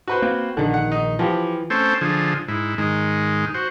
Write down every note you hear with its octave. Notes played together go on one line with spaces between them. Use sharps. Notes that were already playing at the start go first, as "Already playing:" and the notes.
F#4 B4 C5
A#3 C4
A#1 D3 D#3
F#5
D#4
E3 F3 G4
A3 C4 C#4 A4 C5
D3 F3 G#4
G#2 E4
G#2 D#3 G#3
F#4 C5